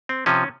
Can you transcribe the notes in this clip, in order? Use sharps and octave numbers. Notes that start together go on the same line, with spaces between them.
C4
C3 F3 C#4